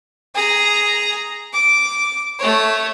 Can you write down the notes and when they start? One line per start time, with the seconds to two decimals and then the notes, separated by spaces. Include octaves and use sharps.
0.35 G#4 A#5
1.54 D6
2.39 A3 C#5